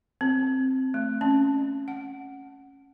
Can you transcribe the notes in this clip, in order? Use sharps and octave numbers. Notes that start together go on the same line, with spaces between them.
C4
A3
C#4
F#5